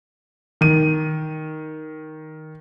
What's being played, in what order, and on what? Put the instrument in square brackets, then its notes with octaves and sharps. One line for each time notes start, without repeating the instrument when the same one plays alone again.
[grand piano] D#3 D#7